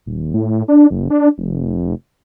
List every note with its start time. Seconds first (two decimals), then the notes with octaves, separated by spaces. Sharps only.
0.06 D#1
0.34 A2
0.68 D4
0.91 F#1
1.10 D4
1.38 F1